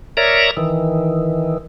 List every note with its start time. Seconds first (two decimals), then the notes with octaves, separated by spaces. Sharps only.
0.17 A#4 C#5 D5 E5 A#5
0.57 D#3 E3